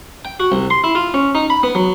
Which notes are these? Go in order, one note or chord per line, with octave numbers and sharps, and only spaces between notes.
G5
F#4
C2
C6
E4
F4
C#4
D#4
B5
B3
F#3